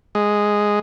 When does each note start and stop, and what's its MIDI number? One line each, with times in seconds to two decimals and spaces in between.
0.15 0.79 56